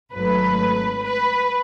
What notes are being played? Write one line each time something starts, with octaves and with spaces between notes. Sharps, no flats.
G#1 G#2 F#3 A3 B4
B4